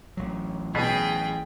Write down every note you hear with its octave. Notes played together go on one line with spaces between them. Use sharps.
A1 F#3
B2 G#4 G5